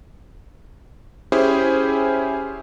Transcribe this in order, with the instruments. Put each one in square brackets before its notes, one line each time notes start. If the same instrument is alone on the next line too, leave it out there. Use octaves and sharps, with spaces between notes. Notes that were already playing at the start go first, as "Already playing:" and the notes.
[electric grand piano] C#4 E4 G4 G#4 C5